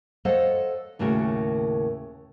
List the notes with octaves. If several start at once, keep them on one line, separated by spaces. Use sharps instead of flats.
A4 C5 C#5 D#5 F5 F#5
D#2 A2 C#3 F#4 A#4